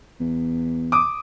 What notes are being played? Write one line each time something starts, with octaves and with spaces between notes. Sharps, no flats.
E2
D6 D#6